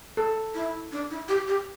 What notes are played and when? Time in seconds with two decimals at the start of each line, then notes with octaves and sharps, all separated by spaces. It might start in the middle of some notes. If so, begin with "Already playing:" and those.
0.17 A4
0.54 E4
0.92 D4
1.10 E4
1.28 G4
1.47 G4